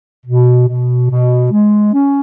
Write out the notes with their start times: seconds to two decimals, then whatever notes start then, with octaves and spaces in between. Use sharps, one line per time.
0.26 B2
0.68 B2
1.10 B2
1.51 G#3
1.93 C#4